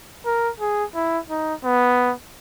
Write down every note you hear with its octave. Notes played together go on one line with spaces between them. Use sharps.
A#4
G#4
E4
D#4
B3